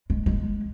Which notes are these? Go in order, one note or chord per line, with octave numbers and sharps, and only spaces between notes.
G#3
G#3